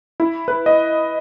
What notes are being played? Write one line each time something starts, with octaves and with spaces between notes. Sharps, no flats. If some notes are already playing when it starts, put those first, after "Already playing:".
E4
B4
D#5